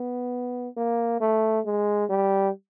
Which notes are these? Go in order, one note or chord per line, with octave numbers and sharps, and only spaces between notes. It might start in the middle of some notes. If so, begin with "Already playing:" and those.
Already playing: B3
A#3
A3
G#3
G3